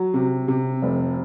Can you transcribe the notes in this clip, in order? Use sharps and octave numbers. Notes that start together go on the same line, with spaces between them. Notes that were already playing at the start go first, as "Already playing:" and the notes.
Already playing: F#3
C3
C3
F1